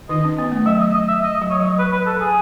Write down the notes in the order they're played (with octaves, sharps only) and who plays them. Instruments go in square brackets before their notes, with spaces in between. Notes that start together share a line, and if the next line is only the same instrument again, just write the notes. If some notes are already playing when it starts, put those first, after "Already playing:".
[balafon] D#3 D#4 [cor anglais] D#5
[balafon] C#4
B3
A3
[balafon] F#3 [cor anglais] E5
[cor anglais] D#5
D#5
E5
D#5
[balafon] F#3
[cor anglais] C#5
[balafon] F#3
[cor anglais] B4
B4
A4
G#4